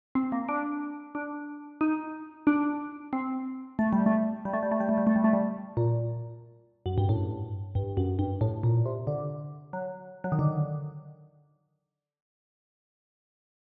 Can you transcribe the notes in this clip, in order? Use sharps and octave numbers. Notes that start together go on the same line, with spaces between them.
C4
A#3
D4
D4
D#4
D4
C4
A3
G3
A3
G3
A3
G3
A3
G3
A3
G3
A3
G3
A3
G3
A#2
F#2
G2
A2
G2
F#2
G2
A2
A#2
C3
D3
F#3
F#3
D#3
D3